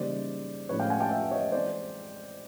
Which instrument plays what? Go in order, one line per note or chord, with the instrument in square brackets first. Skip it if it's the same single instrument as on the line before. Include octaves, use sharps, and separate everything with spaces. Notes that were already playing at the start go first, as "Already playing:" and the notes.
Already playing: [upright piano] C#3 E3 G3 A#3 D#4 C5 D5
A2 F3 G#3 C#4 B4 C#5
F5 G5
F#5 G#5
G5 A5
E5 F#5
C#5 D#5
E3 G#3 C4 C5 D5